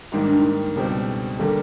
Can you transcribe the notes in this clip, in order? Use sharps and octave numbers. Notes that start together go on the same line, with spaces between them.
G#2 D#3 G3 A#3 D#4
D4
D#4
C#2 B2 G3 C4
D3 G3 A#3 A4